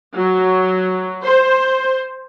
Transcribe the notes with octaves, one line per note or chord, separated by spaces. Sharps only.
F#3
C5